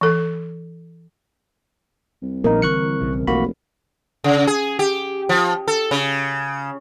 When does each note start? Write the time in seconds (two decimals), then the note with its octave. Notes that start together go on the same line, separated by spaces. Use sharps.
0.01 E3 A4
2.22 C2
2.44 A#1 A#3 B3 D#4 A#4
2.62 D3 E3 C#6 F#6 C#7
3.00 B1 C#3 E3
3.27 F1 B1 D#3 E3 A#3 F#4 B5
4.24 C#3
4.47 G#4
4.79 G4
5.29 F3
5.68 A4
5.91 C#3